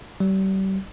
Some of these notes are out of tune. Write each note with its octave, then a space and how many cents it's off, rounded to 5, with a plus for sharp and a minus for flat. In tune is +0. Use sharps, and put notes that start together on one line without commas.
G3 -35